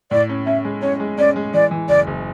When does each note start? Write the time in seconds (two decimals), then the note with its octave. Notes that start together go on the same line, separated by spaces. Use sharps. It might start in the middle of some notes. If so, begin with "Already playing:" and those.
0.11 A2 D5
0.29 C#4
0.46 C#4 E5
0.65 G#3
0.82 C#4 C#5
1.00 G#3
1.18 C#4 D5
1.36 G#3
1.54 E3 D5
1.71 E3
1.89 F#1 D5
2.07 F#1